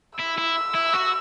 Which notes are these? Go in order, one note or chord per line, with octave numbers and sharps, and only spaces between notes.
E4 E6
E4
E4
F#4